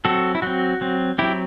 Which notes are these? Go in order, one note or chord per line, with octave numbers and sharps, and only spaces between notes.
F#3 C4 F#4 A4
E4
F#3 C4 F#4
F#3 C4
F#3 C4 E4 G4